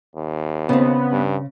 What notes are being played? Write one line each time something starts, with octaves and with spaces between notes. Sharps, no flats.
D#2
C#3 B3 C4
G2